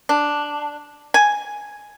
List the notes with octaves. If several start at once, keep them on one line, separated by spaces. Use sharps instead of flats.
D4
G#5